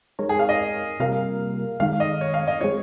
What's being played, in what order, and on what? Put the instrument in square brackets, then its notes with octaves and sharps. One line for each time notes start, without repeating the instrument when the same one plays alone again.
[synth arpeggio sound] G#3 D#4 A#4 C#5
[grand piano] G#4
F5
D#5
[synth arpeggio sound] C3 G3 A#3 F4 A#4 [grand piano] F5
[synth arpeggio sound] D#3 G#3 D#4 [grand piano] F5
[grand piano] D#5
C#5
F5
D#5
[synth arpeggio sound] G#3 C4 F4 [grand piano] C#5